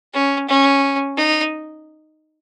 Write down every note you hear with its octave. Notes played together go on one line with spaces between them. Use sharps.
C#4
C#4
D#4